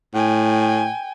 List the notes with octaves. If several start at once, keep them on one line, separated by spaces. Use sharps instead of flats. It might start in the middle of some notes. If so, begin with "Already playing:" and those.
A2 G5 G#5